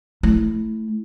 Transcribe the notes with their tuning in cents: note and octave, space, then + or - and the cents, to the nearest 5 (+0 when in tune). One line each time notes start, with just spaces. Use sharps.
A3 +0 E4 +0